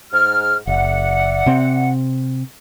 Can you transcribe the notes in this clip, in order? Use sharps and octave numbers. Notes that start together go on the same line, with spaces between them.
G#2 F6
F#1 D5 E5 F#5
C3 C4